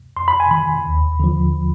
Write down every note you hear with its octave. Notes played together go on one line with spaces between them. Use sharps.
F2 C6
B5
G#5
D#3 B5
D#2
D3 F3